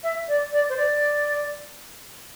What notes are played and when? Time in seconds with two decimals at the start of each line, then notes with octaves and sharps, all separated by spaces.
0.03 E5
0.28 D5
0.52 D5
0.69 C5
0.77 D5